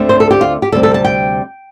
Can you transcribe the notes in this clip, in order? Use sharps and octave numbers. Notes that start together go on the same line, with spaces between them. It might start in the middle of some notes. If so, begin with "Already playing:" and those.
Already playing: D2 D3 A3 C4
C5
A4
G4
F4
G4
D2 C3 G3 C4 A4
A4
A5
G5